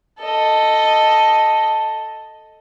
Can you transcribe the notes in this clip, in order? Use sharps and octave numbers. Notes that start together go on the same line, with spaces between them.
A4 D#5